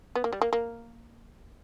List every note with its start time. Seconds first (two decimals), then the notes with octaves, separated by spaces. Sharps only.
0.15 B3
0.24 A#3
0.33 G3
0.42 A#3
0.53 A#3